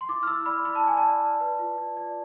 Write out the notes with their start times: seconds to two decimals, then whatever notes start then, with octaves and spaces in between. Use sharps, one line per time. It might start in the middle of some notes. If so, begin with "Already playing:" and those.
0.01 C6
0.09 E4 D6
0.23 F6
0.27 E4 E6
0.46 D5 B5
0.65 E4 B5
0.75 A5
0.84 D5 G#5
0.97 A5
1.02 D5
1.22 D5
1.40 B4
1.59 F4
1.78 D5
1.97 D5